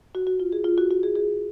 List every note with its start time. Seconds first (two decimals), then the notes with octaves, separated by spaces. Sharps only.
0.15 F#4
0.27 F#4
0.40 F4
0.52 G#4
0.64 F4
0.78 F#4
0.91 F#4
1.03 G#4
1.16 G#4